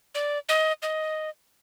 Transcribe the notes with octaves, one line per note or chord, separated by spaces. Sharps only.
D5
D#5
D#5